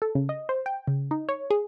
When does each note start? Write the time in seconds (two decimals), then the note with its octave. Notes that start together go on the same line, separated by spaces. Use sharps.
0.02 A4
0.15 C#3
0.29 D#5
0.49 C5
0.66 G5
0.88 C#3
1.11 D#4
1.29 C#5
1.50 G#4